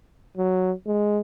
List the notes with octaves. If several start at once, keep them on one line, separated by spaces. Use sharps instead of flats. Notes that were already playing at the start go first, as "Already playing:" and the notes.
F#3
G#3